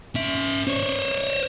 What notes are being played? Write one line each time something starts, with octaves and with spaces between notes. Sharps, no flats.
C#4 E5
C5 C#5